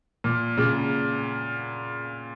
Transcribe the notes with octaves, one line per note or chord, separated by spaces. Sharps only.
A#2
A#2 C#3